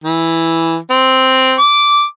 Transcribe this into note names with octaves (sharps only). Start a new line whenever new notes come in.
E3
C4
D6